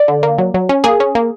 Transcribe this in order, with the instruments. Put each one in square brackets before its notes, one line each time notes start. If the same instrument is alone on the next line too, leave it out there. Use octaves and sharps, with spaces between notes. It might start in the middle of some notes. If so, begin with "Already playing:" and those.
Already playing: [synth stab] D5
D3
A#3
F#3
F#3
C#4
A#3 G#4
C#4
A#3